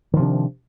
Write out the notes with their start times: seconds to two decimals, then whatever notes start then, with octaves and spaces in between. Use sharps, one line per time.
0.13 D#3
0.16 F3
0.19 C3
0.22 D4